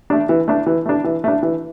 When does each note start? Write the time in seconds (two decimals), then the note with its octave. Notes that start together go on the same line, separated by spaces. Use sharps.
0.10 A3 D4
0.29 E3
0.48 A3 D4
0.66 E3
0.86 A3 D4
1.04 E3
1.24 A3 D4
1.43 E3